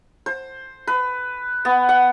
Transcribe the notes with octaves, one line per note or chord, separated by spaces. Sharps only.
C5
B4
B3
F#5